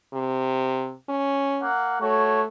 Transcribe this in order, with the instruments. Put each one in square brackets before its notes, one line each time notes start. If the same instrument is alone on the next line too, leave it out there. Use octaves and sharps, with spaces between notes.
[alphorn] C3
C#4
[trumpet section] A#3 F#5
[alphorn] A3 [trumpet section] F#4 C#5